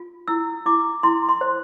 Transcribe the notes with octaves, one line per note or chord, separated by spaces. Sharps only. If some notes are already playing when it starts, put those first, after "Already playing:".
Already playing: F4
E4 E6
E4 D6
E4 C6
C6
C5